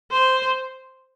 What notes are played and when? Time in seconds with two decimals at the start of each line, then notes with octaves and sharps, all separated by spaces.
0.11 C5